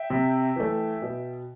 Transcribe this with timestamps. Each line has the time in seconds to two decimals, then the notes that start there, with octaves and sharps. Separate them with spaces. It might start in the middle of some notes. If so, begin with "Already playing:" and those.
Already playing: E5 G5
0.10 C3
0.56 E3 A3
1.02 B2